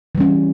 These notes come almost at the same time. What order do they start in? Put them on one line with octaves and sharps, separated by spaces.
E3 G3 C#4